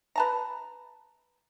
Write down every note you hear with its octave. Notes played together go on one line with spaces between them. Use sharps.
B4 A5 A#5